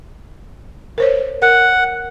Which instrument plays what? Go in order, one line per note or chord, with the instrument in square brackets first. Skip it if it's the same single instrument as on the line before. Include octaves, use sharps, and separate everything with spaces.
[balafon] A#4 C5 C#5
[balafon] A#4 [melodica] F#5